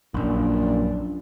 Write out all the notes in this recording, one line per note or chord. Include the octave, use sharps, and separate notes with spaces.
A#1 F#2 A#2 D4